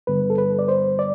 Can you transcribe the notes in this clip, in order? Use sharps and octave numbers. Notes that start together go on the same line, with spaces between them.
G2 D3 G3 B3 B4
A4
B4
D5
C5
D5